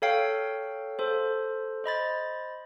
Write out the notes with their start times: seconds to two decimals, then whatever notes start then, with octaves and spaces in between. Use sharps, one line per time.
0.02 A4 C#5 F5 G5
0.99 A4 C5
1.84 C5 D#5 B5 A6